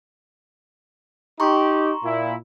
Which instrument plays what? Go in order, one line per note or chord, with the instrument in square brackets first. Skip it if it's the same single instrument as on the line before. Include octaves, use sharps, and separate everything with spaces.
[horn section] D#4 G4 [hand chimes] A#5 C6 C#6
[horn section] A#2 E4